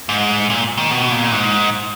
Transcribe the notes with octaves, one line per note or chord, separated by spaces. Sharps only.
G#2
A#2
D#3
B2
A#2
G#2